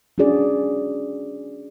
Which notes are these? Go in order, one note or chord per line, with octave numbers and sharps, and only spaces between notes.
C#4 D4 F#4 G#4 D5